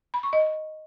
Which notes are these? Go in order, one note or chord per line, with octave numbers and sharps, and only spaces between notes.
B5
C#6
D#5